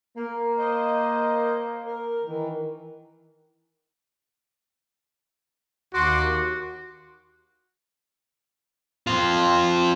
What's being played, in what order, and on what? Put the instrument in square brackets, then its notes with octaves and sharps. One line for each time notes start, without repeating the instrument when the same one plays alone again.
[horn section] A#3
[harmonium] C5 D#5
A#4
D#3 E3
[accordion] D#2 C6 D6 [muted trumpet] F#4
[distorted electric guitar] C4 F4